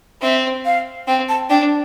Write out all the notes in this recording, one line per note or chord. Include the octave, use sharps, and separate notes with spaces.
C4 E5
F5
C4 G5
A5
D4 G5